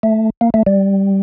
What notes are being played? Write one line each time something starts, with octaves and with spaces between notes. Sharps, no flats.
A3
A#3
A3
G3